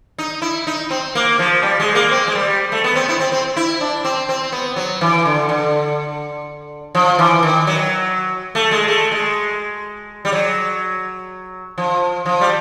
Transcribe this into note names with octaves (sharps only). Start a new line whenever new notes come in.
D#4
E4
D#4
C4
A#3
F3
G3
G#3
A#3
C4
G#3
G3
A3
B3
C4
E4
C4
C4
E4
D4
C4
C4
B3
F#3
E3
D3
D3
F3
E3
D#3
F#3
A3
G#3
A3
G#3
G3
F#3
F3
F3
G3